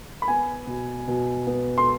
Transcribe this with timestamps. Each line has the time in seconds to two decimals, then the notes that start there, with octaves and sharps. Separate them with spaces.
0.22 B5
0.28 B3 G#5
0.67 B2
1.08 B2
1.47 B3
1.78 C6